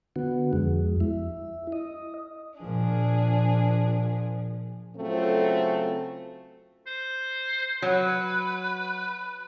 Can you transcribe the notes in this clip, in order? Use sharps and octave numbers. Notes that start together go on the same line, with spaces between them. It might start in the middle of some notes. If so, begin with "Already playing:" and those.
D3 B3 F#4
F2 G#3
E4
D#5
A#2 F3 D4 G#4
C#3 F#3 A3 C4 F4 A4
C5
F#3 B4